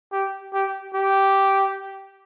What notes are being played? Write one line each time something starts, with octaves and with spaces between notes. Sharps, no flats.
G4
G4
G4